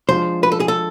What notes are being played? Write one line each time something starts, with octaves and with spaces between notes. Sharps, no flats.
F3 G#3 D4 F4 C5
B4
A4
G#4
A4